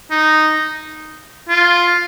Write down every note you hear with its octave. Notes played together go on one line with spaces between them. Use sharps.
D#4
F4